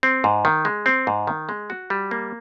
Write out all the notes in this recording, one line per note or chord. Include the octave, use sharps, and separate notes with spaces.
C4
G#2
D#3
G#3
C4
G#2
D#3
G#3
F#4
G3
A#3